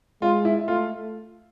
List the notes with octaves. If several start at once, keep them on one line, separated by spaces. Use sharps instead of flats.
G#3 F4
E4
A3 F4